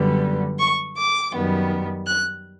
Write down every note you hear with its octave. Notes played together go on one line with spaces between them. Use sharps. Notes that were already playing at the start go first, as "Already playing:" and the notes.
Already playing: F#2 D3 G3 B3
C#6
D6
F#2 D#3 G3 B3
F#6